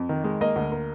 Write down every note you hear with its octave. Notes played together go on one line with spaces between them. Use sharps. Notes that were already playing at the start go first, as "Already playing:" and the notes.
Already playing: F2
D#3
G#3
A#3 D#5
D2
A#3